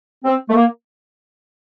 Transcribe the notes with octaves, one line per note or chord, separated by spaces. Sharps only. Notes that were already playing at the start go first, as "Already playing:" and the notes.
C4
A3
A#3